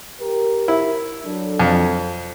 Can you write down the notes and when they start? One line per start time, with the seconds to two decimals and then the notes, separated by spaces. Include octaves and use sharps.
0.20 G4 A#4
0.68 E4
1.25 F#3 D4 A4
1.60 F2